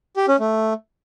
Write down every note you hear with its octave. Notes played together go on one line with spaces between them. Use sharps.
G4
C#4
A3